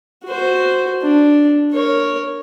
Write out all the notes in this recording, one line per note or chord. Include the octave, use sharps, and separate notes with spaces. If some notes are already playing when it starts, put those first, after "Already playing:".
F#4 C5
D4
A#4 C#5